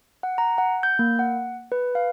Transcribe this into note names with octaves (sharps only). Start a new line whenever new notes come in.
F#5
A#5
F#5
G6
A#3
F#5
B4
F5